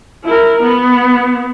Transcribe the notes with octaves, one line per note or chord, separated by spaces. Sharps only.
E4 A#4
B3